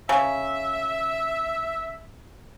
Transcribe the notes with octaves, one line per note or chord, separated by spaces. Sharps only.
C#3 E5